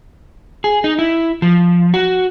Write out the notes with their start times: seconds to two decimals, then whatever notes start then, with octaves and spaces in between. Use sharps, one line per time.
0.64 G#4
0.84 D#4
0.99 E4
1.42 F3
1.94 F#4